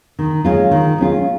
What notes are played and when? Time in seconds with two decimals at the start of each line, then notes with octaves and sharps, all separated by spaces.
0.19 D#3
0.44 G#3 C#4 F4
0.71 D#3
0.98 G#3 C#4 F4